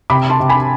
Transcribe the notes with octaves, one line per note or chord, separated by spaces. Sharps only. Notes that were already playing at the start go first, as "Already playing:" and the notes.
C3 B5 D6
A5 C6
C3
G#5 B5